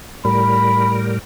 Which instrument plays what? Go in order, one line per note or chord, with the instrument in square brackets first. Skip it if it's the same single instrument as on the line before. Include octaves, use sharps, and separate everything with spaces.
[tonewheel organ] A2 G3 A#4 [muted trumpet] B5